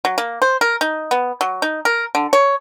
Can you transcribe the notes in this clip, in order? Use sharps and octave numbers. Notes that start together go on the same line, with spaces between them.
F#3
A#3
C5
A#4
D#4
B3
F#3
D#4
A#4
D3
C#5